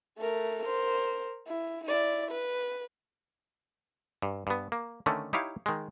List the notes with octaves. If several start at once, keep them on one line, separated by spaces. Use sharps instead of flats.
A3 A#4
A#4 C5
E4
E4 D5
B4
G2
G2 B3
A#3
D3 D#3 A3 C#4 D4
D#4 E4 G4 C#5 F5
D#3 G#3